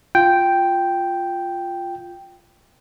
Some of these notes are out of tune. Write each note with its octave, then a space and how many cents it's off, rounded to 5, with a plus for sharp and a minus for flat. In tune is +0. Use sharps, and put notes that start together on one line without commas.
F4 +0 G5 +0